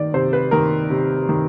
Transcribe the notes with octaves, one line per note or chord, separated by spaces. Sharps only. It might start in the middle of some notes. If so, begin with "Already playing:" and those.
Already playing: D#3 D5
C3 C5
B4
D#3 A#4
C3
D#3